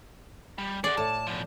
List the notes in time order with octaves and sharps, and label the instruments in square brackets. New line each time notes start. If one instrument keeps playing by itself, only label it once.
[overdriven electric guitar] G3
[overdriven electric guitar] G#4 F#5 [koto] D5
[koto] A2 [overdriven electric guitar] A5
[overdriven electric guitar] B2 F3